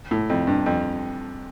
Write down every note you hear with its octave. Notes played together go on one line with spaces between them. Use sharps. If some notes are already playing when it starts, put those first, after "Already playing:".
A2
F2
G2
F2